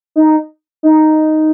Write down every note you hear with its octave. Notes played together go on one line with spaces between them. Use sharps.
D#4
D#4